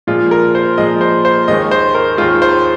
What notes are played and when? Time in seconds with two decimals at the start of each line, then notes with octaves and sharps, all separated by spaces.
0.07 A#2 F3 G#3 F4
0.31 A#4
0.55 C5
0.77 A#2 F3 G#3 D#5
1.01 C5
1.25 C5
1.48 D#2 D#3 G#3 D#5
1.71 C5
1.95 A#4
2.17 D#2 D#3 G#3 F4
2.42 C5